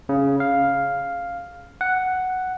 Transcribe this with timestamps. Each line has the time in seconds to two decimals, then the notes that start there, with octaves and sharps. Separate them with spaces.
0.09 C#3
0.40 F5
1.81 F#5